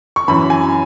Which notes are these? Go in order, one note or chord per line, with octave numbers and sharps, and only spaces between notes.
C#6
F#2 E3 B5
G#5